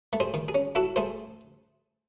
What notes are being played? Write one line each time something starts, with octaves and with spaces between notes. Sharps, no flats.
A3
G#4 C5
D#3
G#4
C#4
E4 F#4 A4
A3 G#4 C5